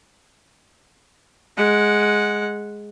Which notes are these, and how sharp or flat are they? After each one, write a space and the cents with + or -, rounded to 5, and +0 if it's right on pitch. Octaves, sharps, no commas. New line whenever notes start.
G#3 +0 F#5 -10